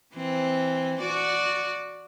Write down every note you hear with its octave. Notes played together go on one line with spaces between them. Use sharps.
E3 C4
F#4 D5